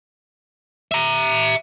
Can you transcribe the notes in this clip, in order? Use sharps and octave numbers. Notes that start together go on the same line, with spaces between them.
E5 A#5